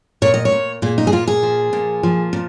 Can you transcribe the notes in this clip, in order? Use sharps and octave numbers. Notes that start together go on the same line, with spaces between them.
A#2 C#5
D#5
C#5
A#2
A#2 G#4
D#4
G#4
A#2 F4
G#4
F3
A#2
F3
A#2